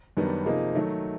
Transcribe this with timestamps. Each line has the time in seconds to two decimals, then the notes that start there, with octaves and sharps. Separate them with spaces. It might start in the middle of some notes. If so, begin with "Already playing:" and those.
0.17 F#2 D#3 G3 B3 D4
0.46 C3 F3 A#3 D#4 G#4
0.75 D#3 F#3 A3